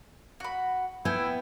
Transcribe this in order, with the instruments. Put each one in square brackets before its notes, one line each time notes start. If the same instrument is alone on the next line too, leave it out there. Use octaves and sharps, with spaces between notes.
[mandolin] F#4 B5
[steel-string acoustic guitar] B3 [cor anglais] E4 [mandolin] G5 G#5